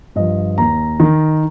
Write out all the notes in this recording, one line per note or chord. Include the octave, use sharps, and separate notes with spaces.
G2 F3 D#5
D#2 A#5
D#3